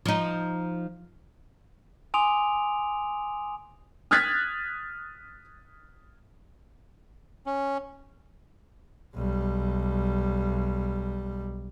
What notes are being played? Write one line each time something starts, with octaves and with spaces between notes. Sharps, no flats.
F3 D#4
G#5 C6 D6 D#6 D7 F7
D#6 F6 F#6 G#6 A6 B6
C#4
B1 G3